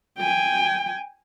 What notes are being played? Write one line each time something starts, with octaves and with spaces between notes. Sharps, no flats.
G5 G#5